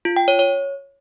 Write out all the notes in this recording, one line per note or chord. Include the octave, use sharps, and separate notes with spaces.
F4
G5
C#5
C#5